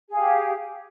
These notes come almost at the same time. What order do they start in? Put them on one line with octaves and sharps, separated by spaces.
G#4 F5 G4